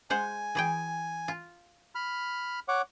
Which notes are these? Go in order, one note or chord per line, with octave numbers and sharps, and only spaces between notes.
G#3 C5 F#5 G#5
E3 G#4 G5
F4
B5 F6
C#5 F#5 D6